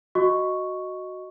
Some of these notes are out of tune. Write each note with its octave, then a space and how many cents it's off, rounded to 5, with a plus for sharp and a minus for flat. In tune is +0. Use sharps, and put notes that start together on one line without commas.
F#4 +0 D#5 +0 C#6 +0